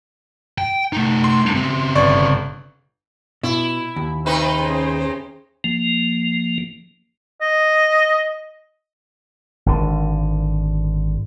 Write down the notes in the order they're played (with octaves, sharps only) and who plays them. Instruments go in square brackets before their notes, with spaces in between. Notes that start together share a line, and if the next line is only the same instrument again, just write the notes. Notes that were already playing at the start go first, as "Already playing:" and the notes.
[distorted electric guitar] G5
A3 D#4
[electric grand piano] C6
[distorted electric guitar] C#3 C4
[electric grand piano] G1 D5 C#6
[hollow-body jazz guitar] B2 [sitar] E4
[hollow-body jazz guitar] D#2
[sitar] C3 D#4 B4
[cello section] C#4 G#4 C5
[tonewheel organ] F3 A#3
[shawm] D#5
[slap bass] G#1 D3